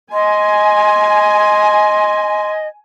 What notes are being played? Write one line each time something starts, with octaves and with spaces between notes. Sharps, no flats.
D#5 G#5 C6